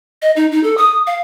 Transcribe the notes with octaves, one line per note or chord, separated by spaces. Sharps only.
D#5
D#4
D#4
A4
D#6
F5